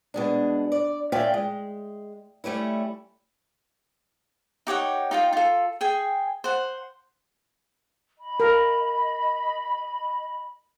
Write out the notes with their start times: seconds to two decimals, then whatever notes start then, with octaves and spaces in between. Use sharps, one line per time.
0.14 B2 G#3 D4
0.72 D5
1.12 A#2 C#4 F4 D5 E5 G5
1.34 G#3
2.44 G3 A3 C#4 E4
4.67 D#4 G4 C#5 F#5
5.11 D#4 F4 G5
5.33 F4 A4
5.81 G#4 G5 G#5
6.44 C5 F#5
8.19 D#5 B5
8.40 A#4